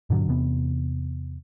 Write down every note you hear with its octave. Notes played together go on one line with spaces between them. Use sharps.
G2 A#2 D3 F#3
E2 C3 B3